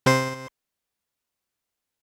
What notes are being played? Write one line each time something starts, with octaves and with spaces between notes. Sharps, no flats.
C3 C5 C6